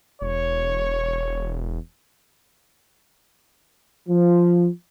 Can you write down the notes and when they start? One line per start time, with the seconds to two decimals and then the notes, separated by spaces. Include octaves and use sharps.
0.22 E1 C#5
4.09 F3